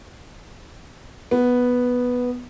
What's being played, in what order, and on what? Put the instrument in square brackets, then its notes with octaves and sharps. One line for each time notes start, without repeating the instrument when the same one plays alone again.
[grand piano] B3